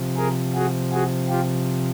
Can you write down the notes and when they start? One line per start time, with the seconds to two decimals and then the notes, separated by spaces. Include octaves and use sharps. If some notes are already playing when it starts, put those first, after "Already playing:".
Already playing: C3 F3
0.16 G#4 A#4
0.55 F#4 G#4
0.92 F#4 G#4
1.29 F4 G4